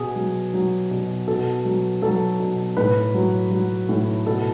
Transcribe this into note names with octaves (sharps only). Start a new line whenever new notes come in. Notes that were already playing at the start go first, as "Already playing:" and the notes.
Already playing: B2 G#4
F#3
F#3
B2
B2 A4
F#3
F#3 A4
B2
A2 B4
F#3
F#3
A2
B2 A4